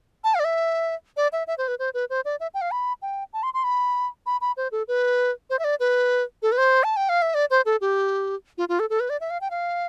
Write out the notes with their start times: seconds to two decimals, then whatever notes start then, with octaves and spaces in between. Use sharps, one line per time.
0.24 A5
0.35 F5
0.40 D5
0.45 E5
1.17 D5
1.33 E5
1.47 E5
1.58 C5
1.68 B4
1.79 C5
1.94 B4
2.10 C5
2.25 D5
2.40 E5
2.54 G5
2.61 F5
2.71 B5
3.02 G5
3.33 A5
3.43 C6
3.54 C6
3.64 B5
4.26 B5
4.41 B5
4.57 C5
4.72 A4
4.88 B4
5.50 C5
5.59 E5
5.64 D5
5.80 B4
6.42 A4
6.52 B4
6.58 C5
6.84 A5
6.97 G5
7.09 F5
7.22 E5
7.34 D5
7.51 C5
7.66 A4
7.81 G4
8.58 F4
8.69 F4
8.80 A4
8.90 A4
9.00 B4
9.10 D5
9.21 E5
9.30 F5
9.41 G5
9.51 F5